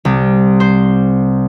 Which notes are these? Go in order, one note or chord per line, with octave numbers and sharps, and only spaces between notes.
C2
C5